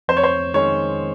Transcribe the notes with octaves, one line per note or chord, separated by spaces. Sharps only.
F2 C5
C#5
C5
D#3 G#3 C#4 C#5